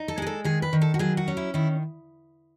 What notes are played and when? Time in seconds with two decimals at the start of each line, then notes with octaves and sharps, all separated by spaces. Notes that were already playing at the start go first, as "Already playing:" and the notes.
Already playing: D#4
0.08 A4
0.18 G#3 G#4
0.27 A4
0.44 D#3 G#4
0.62 B4
0.73 D#3
0.82 A4
0.94 F#4
0.99 F#3 G#4
1.17 F#4
1.28 C#4
1.37 E4
1.54 D#3 E4